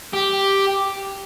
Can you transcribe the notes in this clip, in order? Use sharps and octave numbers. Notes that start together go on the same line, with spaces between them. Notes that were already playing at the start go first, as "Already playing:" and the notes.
G4